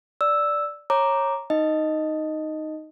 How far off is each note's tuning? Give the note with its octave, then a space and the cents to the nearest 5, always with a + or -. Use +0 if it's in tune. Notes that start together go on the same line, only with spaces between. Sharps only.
D5 +0 E6 +0
C#5 -20 A#5 +0 D6 +0
D#4 +0 D#5 +0